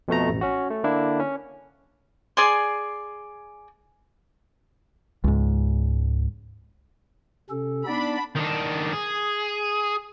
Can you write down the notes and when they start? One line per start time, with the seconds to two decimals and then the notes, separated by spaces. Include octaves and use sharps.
0.08 F2 B2 A3 A#5
0.30 A1
0.41 C#4 F#4
0.71 A3
0.84 D3 A#3 D4 E4
1.20 C#4
2.37 G#4 D5 G#5 C6
5.24 C#2 G#2
7.50 C3 C#4 A4
7.87 B3 D4 D#4 D5 B5
8.36 D#3 D4
8.93 G#4